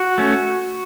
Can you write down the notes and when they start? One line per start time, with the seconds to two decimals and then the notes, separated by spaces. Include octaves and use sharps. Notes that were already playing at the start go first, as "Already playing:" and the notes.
Already playing: F#4
0.18 A3 C#4